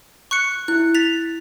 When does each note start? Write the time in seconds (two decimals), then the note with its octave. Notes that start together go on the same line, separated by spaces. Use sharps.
0.31 C#6 F#6 C#7
0.68 E4 F#6
0.95 A6 B6 F7